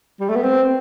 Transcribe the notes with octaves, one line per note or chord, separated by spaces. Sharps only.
G3
A3
B3
C4